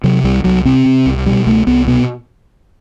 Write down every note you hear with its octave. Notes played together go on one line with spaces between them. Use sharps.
C3 F#3
C2 G3
C2 F#3
C3 C4
C3
C2
B2 G3
C2 A3
C2 B3
B2 B3